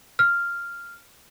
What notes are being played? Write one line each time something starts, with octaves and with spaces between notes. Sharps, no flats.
F6